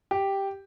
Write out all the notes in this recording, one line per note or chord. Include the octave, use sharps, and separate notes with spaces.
G4